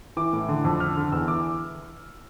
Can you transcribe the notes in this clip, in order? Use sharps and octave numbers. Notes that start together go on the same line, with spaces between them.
E3 D6
A2
D3
F2
D3 F6
D3
E2 E6
E3 D6